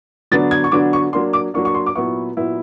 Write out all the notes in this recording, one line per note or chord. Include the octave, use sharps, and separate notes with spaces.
D3 F#3 B3 D4 A6
G#6
C#6
D3 F#3 B3 D4 D6
C#6
F#3 A#3 D4 C6
D6
F#3 A#3 D4 C#6
C#6
C6
D6
A#2 F#3 B3 E4 C#6
A#2 F#3 B3 E4